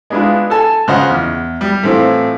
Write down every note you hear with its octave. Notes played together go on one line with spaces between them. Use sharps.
G#3 B3 D4 E4 F4
A4 G#5 A5
C#3 F4 C5 D#5 F#5
E2
G3
A2 E3 C4 F4